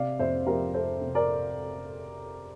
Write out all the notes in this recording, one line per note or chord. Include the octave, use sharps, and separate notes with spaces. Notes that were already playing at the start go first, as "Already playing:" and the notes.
Already playing: C3 D5 F5
F2 C5 E5
F3 G4 A#4
F2 A4 C5
C3
A#4 D5